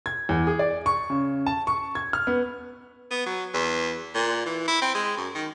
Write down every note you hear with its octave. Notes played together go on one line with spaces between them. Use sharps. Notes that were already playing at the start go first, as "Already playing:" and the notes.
G#6
E2
G#4
D5
C#6
C#3
A5
C#6
G#6
F6
B3
B3
F#3
E2
A#2
E3
E4
C4
G#3
F#2
D#3